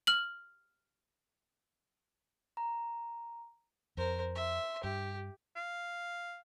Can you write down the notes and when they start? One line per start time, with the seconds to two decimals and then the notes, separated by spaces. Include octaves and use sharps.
0.07 F6 F#7
2.57 A#5
3.97 F2 A#4 C5
4.35 E5 C6
4.84 G2 G4
5.56 F5